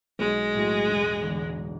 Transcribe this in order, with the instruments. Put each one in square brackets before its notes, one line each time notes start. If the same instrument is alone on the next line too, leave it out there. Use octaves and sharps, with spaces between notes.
[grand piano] B1 [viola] G#3
[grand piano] A2 F#3 A3
E1
E2 D3